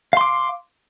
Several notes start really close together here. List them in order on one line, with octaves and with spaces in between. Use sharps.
F5 C6 D6